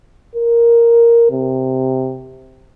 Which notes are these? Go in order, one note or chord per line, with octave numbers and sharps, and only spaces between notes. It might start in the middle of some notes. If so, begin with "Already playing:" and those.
A#4
C3